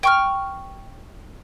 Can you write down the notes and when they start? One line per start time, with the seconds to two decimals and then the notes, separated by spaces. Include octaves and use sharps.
0.03 G5 C#6 F6